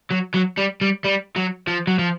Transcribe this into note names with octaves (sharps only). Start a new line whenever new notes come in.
F#3
F#3
G3
G3
G3
F#3
F3
F#3
F3